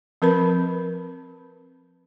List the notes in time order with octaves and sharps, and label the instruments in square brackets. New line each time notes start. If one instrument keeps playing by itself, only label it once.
[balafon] F3 C4 A#4 B4 B5